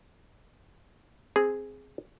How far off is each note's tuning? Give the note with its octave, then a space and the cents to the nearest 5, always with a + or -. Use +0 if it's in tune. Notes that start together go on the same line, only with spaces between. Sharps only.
C4 +0 G#4 +0